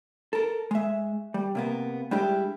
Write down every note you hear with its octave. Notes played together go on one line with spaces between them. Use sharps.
A4 A#4
G#3 E5
G3
C3 A#3 B3
G3 G#3 D4 E4 G4